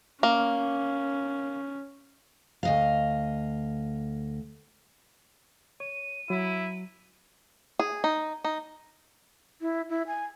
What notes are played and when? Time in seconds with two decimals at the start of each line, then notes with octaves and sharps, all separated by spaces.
0.23 A#3 C#4
2.63 D2 D#5 F5
5.80 C#5 D#7
6.30 F#3 E4
7.79 G#4
8.04 D#4
8.44 D#4
9.61 E4
9.89 E4
10.07 G#5